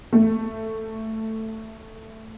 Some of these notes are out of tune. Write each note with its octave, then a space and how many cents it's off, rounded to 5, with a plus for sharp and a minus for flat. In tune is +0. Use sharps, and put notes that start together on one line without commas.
A3 +10